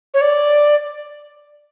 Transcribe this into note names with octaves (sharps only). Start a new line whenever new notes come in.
C#5
D5